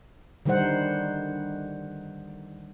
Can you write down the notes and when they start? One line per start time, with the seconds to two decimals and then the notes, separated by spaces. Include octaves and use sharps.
0.45 D3 D#3 G3 D#4 C5 F#5